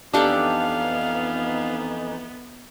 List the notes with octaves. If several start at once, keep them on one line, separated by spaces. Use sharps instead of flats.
F2 E3 B3 D4 D#4 G4 A4 F5